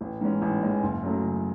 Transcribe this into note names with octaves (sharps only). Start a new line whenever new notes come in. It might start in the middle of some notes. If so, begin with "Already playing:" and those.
A1
G#2 E3 G#3 C#4
A1
G#2 E3 G#3 C#4
F#1
F#2 C#3 F#3 A3
F#1